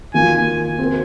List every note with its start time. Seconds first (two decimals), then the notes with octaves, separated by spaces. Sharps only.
0.14 D#3 A#3 F4 G#5
0.79 C4 F#4 A#4